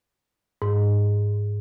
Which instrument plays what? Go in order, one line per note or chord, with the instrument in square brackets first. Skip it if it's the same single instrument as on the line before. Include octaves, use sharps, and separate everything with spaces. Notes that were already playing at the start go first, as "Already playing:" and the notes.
[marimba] G#2